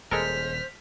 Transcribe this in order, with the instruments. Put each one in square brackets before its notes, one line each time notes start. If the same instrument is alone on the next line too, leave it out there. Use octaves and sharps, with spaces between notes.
[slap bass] D#1 [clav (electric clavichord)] G#3 A4 A#4 [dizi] C5 [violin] F6 B6